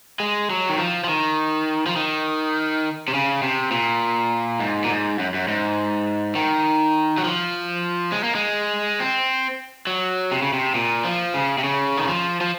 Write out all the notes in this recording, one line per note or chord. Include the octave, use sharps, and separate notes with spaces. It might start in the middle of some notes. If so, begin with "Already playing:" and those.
G#3
F#3
D#3
F3
F3
D#3
F3
D#3
C3
C#3
C3
A#2
G#2
A#2
G#2
F#2
F#2
G#2
D#3
F#3
F3
G#3
A#3
G#3
C4
F#3
C3
C#3
C3
A#2
F3
C#3
C3
C#3
D#3
F3
F3